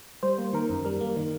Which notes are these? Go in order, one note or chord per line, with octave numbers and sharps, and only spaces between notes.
G3 C5
A#3
D#3 A#4
F#2
G3 A#4
A#3
D#3